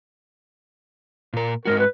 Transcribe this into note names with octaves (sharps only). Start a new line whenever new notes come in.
A#2 A#4
G#2 G#3 F#4 A#4
B4